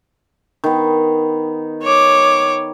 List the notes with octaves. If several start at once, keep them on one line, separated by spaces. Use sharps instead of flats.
D#3 B3
C#5 D6